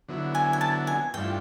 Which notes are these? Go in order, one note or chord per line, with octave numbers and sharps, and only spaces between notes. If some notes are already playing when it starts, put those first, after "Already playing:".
D3 F#3 B3 E4
G#5
G#5
A5
G#5
G2 E3 A3 D4 F4 G5